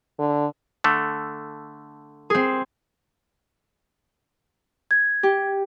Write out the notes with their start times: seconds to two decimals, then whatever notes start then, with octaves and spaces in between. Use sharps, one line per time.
0.19 D3
0.84 D3 A3
2.30 C4 G#4
4.91 G#6
5.23 G4